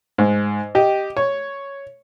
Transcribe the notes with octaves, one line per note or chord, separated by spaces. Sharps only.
G#2
G4 D#5
C#5